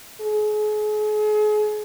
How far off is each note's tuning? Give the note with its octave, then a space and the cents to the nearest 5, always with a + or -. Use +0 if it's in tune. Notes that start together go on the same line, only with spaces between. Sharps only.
G#4 +35